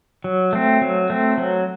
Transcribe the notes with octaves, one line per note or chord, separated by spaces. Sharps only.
F#3
A3 C4
F#3
A3 C4
F#3